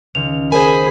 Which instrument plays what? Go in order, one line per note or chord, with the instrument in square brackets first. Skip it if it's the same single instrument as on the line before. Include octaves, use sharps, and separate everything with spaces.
[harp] C#2 D#3 [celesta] F7
[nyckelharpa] G#4 B5 [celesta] A#4 [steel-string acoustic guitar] C5 G#5